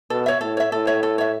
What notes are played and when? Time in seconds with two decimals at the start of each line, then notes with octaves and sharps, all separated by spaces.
0.10 B2 A4
0.26 C#5 E5
0.41 A2 A4
0.57 C#5 E5
0.72 A2 A4
0.87 C#5 E5
1.03 A4
1.18 C#5 E5